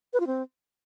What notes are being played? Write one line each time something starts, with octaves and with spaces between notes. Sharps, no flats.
B4
F4
C4